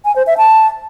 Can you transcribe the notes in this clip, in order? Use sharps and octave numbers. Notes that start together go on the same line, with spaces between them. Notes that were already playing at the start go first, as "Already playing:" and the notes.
G#5
C5
E5
A5